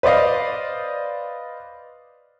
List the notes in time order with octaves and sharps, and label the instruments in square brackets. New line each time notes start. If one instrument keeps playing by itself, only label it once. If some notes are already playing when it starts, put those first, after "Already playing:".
[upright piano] B4 C5 D5 D#5 F5